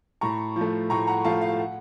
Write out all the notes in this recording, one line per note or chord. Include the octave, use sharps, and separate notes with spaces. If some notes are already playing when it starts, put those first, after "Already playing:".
A2 A#5 C#6
F3
A3
A2 A#5 C#6
F#5 A#5
F3 A3 F5 A5
F5
F#5